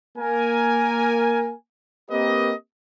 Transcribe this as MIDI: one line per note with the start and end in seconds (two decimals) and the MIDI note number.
0.18 1.53 58
0.18 1.53 70
0.18 1.53 80
2.11 2.53 58
2.11 2.53 60
2.11 2.53 67
2.11 2.53 70
2.11 2.53 71
2.11 2.53 75